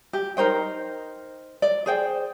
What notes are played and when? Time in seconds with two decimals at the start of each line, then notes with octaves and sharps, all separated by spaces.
0.13 G4
0.37 D#4 A#4 C5 G5
1.62 D5
1.86 G#4 C5 G5